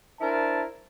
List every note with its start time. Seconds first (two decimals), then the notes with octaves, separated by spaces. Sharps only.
0.21 D4 E4 A#4 C5 A5